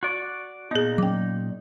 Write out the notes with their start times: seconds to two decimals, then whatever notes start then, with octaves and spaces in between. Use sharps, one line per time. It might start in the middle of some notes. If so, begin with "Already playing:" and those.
0.03 F#4 D5
0.71 A#2 B3 D#4 G#4
0.98 F#3 C#4 G5 D6